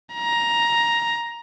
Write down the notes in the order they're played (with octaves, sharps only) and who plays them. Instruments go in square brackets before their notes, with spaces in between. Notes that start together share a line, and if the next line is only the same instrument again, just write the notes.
[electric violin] A#5